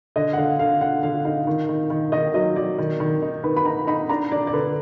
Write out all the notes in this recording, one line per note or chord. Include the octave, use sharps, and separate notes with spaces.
D3 D#5
F#5
D3 F5
D3 F5
D3 F#5
D3 F5
D#4 F5
D#3
D#3
D#3
D#3 D#5
F#3 D#5
F#3 D5
D#3
D#3
D#4
D#3 B4
B5
D#4 A#5
D#4 B5
D4 A#5
D4 D5
D5
D3 B4